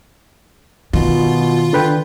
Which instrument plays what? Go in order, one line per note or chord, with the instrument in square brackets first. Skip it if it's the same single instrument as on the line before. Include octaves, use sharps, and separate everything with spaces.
[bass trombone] B2 [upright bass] D#3 [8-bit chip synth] F4
[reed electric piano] D3 B4 G5